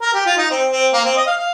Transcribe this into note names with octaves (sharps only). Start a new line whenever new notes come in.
A#4
G4
F4
D#4
C4
C4
A#3
C4
D#5
F5
F5